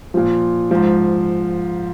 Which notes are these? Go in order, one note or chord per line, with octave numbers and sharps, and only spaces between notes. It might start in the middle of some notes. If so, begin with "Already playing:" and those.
A#2 F3
G#2 F3